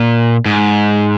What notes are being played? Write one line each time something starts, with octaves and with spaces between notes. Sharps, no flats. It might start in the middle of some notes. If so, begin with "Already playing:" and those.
Already playing: A#2
G#2